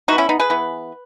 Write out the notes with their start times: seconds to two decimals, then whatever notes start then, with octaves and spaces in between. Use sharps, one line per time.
0.08 E3 D#4 F#4
0.13 B3
0.18 C#4 E4
0.29 B3 D#4
0.39 G#4 B4
0.50 E3 B3